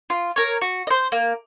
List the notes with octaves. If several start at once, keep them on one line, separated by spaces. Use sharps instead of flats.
F4
A#4 C#5
F#4
D#5
C5
A#3